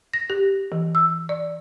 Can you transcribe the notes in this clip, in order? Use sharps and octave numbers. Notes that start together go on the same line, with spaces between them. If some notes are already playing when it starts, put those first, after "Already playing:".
A#6
G4
E3
E6
D5